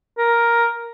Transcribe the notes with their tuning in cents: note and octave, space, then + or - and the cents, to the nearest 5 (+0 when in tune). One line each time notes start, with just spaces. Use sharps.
A#4 +5